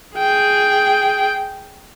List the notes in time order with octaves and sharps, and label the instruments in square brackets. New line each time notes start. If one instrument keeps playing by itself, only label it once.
[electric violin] G#4 G5